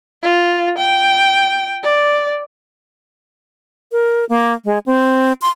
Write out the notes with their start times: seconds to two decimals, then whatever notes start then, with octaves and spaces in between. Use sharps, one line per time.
0.22 F4
0.78 G5
1.83 D5
3.92 A#4
4.29 A#3
4.65 G#3
4.86 C4
5.42 C6